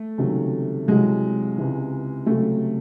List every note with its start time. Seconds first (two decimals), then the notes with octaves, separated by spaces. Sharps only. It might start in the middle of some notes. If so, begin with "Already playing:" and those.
Already playing: A3
0.18 C#2 C3 D#3 F#3
0.88 C2 C3 F#3 G#3
1.57 C#2 C3 E3
2.26 C#2 C3 F#3 A3